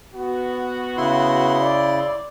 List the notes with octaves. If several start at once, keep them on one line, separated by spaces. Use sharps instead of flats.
B3 F#4
C#3 E4 C6
D5